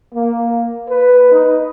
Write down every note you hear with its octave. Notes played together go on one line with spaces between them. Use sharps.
A#3
B4
D#4